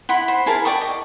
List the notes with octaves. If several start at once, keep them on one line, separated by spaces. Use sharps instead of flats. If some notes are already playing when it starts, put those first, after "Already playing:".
E4 F#5 B5 C6
C5
E4 G#4 A#4 A5
D5 G5 C#6 D#6
D#5